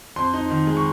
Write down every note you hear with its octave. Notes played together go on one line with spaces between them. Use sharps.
F2 C6
D#4
D#3
G#3
C#6